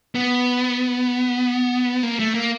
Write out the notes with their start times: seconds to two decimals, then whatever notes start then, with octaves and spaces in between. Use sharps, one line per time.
0.15 B3
2.03 A#3
2.19 A3
2.34 A#3